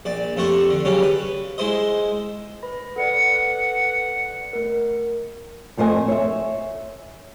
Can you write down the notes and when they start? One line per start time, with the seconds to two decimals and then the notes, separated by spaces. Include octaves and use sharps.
0.05 A#1 D5
0.37 F2 C3 A3 F#5 C#6
0.70 D3
0.85 C#3 F#3 G3 C#4
1.03 B4
1.58 G#3 E4 C5 D#5
2.63 B4 B5 A#6
2.96 A4 B4 D5 F#5
4.53 A3 A#4
5.77 F2 A3 C5 D#5 G#5
6.08 C#5 E5